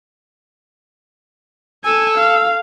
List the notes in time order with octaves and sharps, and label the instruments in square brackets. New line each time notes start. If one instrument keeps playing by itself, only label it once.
[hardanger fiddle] A4 [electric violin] G#5 [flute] E6
[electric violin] F5